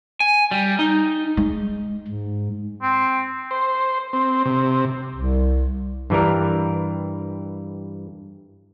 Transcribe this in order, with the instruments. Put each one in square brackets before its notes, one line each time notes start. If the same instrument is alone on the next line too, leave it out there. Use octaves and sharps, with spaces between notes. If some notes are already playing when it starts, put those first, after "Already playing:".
[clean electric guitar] G#5
G3
D#4
[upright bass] G#3
[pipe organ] G#2
[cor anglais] C4
[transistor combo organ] C5
C4
C3
[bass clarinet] C2
[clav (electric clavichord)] G2 E3 G3 A#4